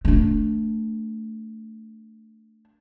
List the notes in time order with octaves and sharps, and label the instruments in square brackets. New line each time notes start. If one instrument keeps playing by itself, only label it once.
[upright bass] A3 D4